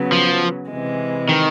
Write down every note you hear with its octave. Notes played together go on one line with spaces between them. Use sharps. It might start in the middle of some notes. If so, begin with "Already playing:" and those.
Already playing: C#3 F#3 B3
F3
C3 E3 G#3
D#3